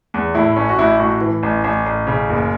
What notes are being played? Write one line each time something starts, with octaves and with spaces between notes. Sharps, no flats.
E2
A2 E4
A1 C#4
F#4
A1 E4
A2 F#4
E3
A1
A1
A1
C#3
F#1